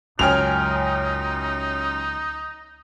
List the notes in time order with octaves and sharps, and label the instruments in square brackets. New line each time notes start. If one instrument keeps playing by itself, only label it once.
[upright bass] C#2 [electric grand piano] F#2 G#5 F6 [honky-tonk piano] C#4 G5 F7 [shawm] D#4